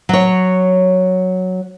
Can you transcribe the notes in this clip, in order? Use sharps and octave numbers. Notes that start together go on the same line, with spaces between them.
F#3 C#5